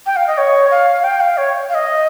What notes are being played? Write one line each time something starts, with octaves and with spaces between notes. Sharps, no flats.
G5
F5
D#5
C#5
F5
G5
F5
C#5
F5
D#5